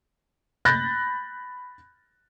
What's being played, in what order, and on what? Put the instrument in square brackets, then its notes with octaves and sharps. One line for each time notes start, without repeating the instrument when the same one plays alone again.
[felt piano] B5 F#6 G6 A6 A#6